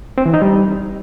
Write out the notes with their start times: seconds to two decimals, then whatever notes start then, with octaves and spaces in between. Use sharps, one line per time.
0.18 C4
0.26 E3
0.34 D#4
0.42 G3